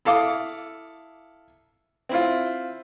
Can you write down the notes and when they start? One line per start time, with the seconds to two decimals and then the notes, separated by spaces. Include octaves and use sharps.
0.05 E4 A4 F5 D6 D#6
2.09 C4 E4 F4